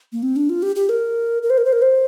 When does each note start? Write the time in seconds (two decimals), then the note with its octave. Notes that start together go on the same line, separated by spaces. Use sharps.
0.13 A#3
0.23 C4
0.36 D4
0.49 F4
0.63 G4
0.76 G4
0.89 A#4
1.43 A#4
1.50 C5
1.58 A#4
1.65 C5
1.73 A#4
1.82 C5